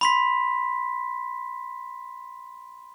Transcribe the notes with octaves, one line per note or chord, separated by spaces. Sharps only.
B5 C6 B6